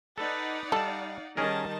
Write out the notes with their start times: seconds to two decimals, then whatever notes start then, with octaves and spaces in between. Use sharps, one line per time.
0.18 D#4 A4 B4 D5 F#5
0.72 G3 A4 F5 A5
1.37 D#3 G3 C#4 G#4 A#4 D#5 A5